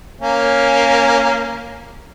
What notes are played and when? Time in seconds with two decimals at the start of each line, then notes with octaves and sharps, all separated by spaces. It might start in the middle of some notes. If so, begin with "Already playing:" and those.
0.21 A#3 C#4